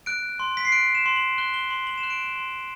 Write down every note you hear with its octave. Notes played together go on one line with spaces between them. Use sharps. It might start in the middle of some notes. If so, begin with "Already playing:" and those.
F#6 D7
C6
B6
C7
F#6 D7
E7
C6
F#7
F#6 G7
G7
C6 F#7
F#7
E7
F#6
D7
E7
C6